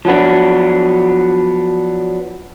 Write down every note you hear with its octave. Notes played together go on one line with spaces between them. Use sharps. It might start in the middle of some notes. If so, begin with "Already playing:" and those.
F3 F#3 B3 D4